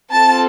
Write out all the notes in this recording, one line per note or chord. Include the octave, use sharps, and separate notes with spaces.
C4 F4 A4 A5